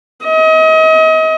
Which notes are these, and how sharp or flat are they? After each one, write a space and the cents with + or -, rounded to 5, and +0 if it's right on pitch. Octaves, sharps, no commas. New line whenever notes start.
D#5 +35